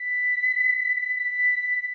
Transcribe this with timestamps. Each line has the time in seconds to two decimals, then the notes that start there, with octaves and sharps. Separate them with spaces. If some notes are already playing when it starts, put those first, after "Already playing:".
Already playing: B6
1.14 B6